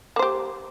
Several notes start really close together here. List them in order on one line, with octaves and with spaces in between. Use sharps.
A#3 C5 G4